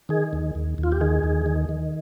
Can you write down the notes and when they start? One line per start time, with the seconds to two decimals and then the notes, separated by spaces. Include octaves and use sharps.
0.09 D#3 G#4
0.33 D#2
0.55 D#2
0.78 D#2
0.83 F4
0.92 G4
1.01 D#3 G#4
1.23 D#2
1.46 D#3
1.69 D#3